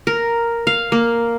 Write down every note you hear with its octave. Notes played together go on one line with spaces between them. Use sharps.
A#4
F5
A#3